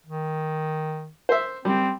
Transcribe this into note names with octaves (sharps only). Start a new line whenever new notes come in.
D#3
C5 E5
G3 C4